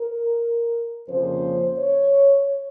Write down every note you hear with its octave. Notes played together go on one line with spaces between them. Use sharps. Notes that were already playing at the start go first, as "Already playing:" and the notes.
Already playing: A#4
F2 C#3 F3 A#3 C#4 C5
C#5